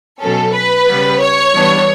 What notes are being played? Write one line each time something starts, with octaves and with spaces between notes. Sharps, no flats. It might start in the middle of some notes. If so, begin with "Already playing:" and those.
B2 F#3 C#4 A4
B4
C#3 G3 B3
C#5
E3 G3 B3 D4